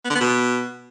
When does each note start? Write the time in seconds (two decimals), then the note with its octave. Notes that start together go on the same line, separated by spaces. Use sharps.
0.05 B3
0.10 D3
0.15 B3
0.20 B2